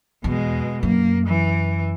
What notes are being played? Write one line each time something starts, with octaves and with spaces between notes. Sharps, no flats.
E2 B2 G#3
F#2 A#3
E3